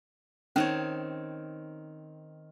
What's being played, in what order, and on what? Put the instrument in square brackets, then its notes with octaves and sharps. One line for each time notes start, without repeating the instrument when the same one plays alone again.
[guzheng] D#3 C4 C#5 [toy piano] C#4